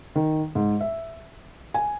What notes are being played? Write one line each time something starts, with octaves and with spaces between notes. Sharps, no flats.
D#3
G#2
E5
G#5